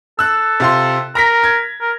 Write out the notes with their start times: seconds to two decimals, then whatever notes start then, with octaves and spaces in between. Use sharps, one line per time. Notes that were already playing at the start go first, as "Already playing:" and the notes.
0.19 A4 E6 F#6
0.60 C3 F4 C6
1.15 A#4 A#5 A#6 B6
1.44 G#6
1.81 A#4